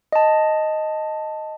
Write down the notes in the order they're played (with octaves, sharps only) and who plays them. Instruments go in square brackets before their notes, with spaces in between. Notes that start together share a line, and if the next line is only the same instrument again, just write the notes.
[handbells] D#5 A5